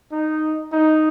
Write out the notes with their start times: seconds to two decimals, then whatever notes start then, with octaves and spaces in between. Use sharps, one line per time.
0.12 D#4
0.72 D#4